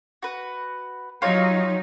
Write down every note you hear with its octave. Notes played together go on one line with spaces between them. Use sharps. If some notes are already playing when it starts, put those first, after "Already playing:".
F#4 B4
F#3 D#4 F4 G4 C#5